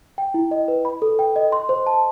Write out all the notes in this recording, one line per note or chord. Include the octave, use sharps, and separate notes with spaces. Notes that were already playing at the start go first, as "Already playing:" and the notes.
G5
E4
D#5
B4
B5
A4
G5
D#5
C6
C5
A5